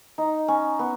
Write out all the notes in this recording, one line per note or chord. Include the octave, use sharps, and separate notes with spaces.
D#4
C#4
B3